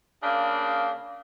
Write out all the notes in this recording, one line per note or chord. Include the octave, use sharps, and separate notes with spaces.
C#3 A#3 D4